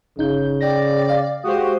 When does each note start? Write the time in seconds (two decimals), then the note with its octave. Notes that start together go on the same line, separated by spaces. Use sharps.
0.17 G1 C#3 D#4 G6
0.61 D5 G5 A#6
1.09 F5
1.44 G#3 F#4 G4 C5 D#6